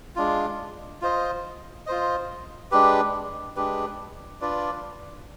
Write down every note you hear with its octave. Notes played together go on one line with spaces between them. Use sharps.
G#3 D4 F4
F4 C5 D#5
F4 C5 D#5
G#3 D4 G4 B4
G#3 D4 G4 B4
D4 F4 B4 D5